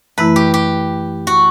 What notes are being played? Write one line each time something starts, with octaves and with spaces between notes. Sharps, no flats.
F#2 E3 A3 E4 B4
G4
G4
F#4